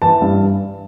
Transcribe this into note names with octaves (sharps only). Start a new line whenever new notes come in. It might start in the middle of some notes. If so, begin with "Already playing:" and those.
E3 A5
G2